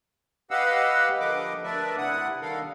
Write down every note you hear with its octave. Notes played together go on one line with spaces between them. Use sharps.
G4 B4 D#5 F5 F#5 E6
D3 F3 A#4 B4 D#5 D6
A3 D4 A#4 B4 D5 E5
C3 E4 F#5 D#6
D3 D#3 G3 A4 A#4 F5